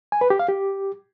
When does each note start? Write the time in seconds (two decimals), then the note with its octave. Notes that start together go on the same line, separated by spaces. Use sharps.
0.12 G#5
0.21 B4
0.30 G4
0.39 F5
0.49 G4